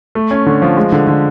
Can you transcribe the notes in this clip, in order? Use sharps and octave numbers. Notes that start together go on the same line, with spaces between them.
A3
C#4
D3
F3
G#3
D3
D3